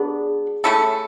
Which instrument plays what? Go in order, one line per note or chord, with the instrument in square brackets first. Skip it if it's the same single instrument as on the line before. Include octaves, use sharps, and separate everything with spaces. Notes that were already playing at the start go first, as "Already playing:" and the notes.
Already playing: [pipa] F#3 B3 D4 [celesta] G#4
[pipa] A3 C#4 E4 A4